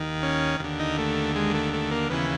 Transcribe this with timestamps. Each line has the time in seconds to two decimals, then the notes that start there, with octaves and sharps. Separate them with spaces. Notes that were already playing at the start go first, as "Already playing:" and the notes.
Already playing: D#2 D#3
0.23 C#4
0.60 D#2 D3
0.80 D#4
0.98 A3
1.35 G#3
1.54 A3
1.73 A3
1.91 A#3
2.10 D#2 C#3 E3 B3